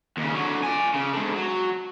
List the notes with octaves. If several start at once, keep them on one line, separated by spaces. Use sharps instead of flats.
D#2 C#3
D3 F#3
D5 G#5
C#3
G#2 D3
F#3